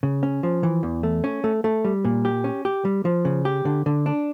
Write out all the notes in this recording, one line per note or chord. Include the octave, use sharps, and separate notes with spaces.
C#3
C#4
F3
E3
E2
A3
C#4
A3
A3
G3
A#2
G4
C#4
G4
G3
F3
C#3
G4
D3
D3
D4